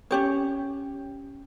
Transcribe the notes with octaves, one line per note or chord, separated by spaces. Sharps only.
C#4 G4 C#5